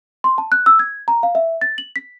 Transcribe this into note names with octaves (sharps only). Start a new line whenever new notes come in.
C6
A5
F#6
E6
G#6
A#5
F5
E5
A6
F#7
B6